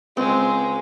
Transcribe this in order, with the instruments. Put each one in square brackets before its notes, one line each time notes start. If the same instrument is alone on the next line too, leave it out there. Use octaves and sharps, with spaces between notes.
[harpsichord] C#2 [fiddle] G#3 [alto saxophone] C4